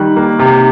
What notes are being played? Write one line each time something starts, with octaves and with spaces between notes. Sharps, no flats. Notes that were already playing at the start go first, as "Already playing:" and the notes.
Already playing: D#3 G3 F#6
A#3
C3